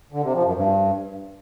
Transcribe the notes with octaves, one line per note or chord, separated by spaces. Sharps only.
D3
C3
F3
F#2
G2